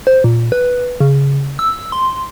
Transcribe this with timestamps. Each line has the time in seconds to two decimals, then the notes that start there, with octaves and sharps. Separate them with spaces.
0.07 C5
0.24 A#2
0.52 B4
1.01 C#3
1.59 E6
1.92 C6